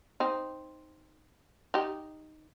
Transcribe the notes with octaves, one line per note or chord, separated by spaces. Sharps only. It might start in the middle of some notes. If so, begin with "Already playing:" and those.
C4 D#4
D#4 G4